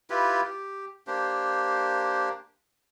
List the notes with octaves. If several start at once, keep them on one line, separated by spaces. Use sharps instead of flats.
E4 F4 G4 B4
G4
A#3 D4 G4 C5